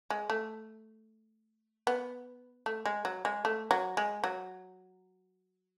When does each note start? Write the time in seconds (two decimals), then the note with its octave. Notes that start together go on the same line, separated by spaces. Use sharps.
0.10 G#3
0.30 A3
1.87 B3
2.66 A3
2.86 G#3
3.05 F#3
3.25 G#3
3.45 A3
3.71 F#3
3.97 G#3
4.24 F#3